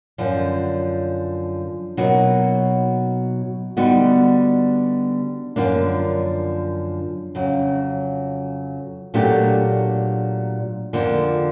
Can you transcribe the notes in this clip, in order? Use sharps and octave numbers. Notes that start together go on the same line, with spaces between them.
F#2 D3 F3
B2 F#3 A#3 D#4 F#4
D3 G3 B3 D#4 F#4
F#2 D3 F3 A#3 D4
F2 C#3 F#3
A#2 F#3 A3 D4 G4
F2 D3 F3 A#3